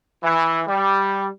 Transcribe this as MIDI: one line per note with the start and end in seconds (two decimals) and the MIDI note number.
0.24 0.60 52
0.67 1.26 55